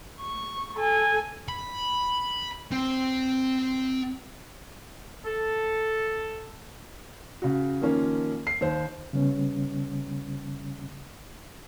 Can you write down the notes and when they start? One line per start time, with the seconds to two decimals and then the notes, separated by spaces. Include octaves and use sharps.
0.21 C#6
0.76 A4 G#5
1.48 B5
2.72 C4
5.25 A4
7.42 C#3 F#4
7.82 D#3 F3 A#3 C#4
8.47 C7
8.61 D#2 D#3 C5
9.13 C#3 G3 B3 C#4